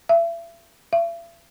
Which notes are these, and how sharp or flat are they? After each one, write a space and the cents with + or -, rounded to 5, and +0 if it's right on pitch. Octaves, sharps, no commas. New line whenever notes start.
E5 +35
E5 +45